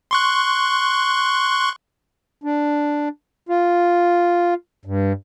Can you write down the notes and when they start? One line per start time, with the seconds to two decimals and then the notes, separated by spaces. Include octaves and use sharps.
0.11 C6 C#6 F#6
2.44 D4
3.49 F4
4.85 G2